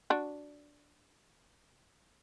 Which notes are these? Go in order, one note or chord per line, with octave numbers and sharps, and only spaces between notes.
D4 F#4